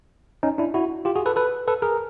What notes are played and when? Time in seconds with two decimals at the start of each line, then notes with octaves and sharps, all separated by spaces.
0.43 C#4 D#4
0.58 D4 E4
0.74 E4 F#4
1.05 F4 G4
1.15 F#4 G#4
1.26 A4 B4
1.36 A4 B4
1.68 A4 B4
1.82 G#4 A#4